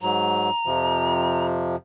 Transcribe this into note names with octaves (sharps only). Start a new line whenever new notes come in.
G#2 F#3 A#5
F2 C3 F3